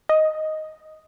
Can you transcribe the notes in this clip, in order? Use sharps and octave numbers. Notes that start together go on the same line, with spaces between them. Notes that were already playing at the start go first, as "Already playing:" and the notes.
D#5